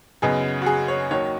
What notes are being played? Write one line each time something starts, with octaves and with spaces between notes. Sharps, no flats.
F#2 C#3 B3 D#4 G#4
F#4
G#4
C#5
D#2 D#3 F#3 C#5